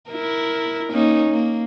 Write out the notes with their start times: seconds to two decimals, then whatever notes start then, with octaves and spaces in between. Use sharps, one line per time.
0.11 E4 A#4
0.91 A#3 C#4 D#4
1.30 A#3